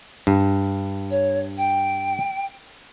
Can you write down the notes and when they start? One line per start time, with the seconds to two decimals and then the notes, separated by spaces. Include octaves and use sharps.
0.27 G2
1.11 C#5
1.58 G5